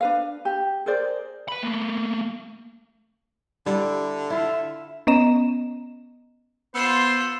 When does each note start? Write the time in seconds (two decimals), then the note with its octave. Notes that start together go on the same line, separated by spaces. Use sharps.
0.01 D4 B4 F5
0.45 G4
0.86 G#4 A#4 C5 D5
1.48 B4 B5
1.63 A3 A#3
3.66 D3 G3 E4
4.30 E4 F4 E5
5.07 B3 C#4 D#5 A#5 E7
6.75 B3 F4 C5 C6 E6 E7